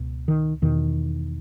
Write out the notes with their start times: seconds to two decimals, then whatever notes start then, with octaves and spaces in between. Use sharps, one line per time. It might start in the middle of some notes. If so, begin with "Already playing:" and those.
Already playing: C#2 B2
0.28 D#3
0.62 E2 B2 D#3